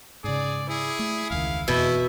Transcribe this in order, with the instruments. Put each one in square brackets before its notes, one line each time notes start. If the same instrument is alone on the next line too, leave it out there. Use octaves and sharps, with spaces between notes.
[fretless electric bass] G#2 C#3 [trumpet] G#4 [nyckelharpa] D5
[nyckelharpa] E4 [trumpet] G#4
[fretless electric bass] A3
[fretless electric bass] E1 C#2 D#3 [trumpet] F5
[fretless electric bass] E1 F2 E3 [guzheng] B2 [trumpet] E4 [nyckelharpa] E5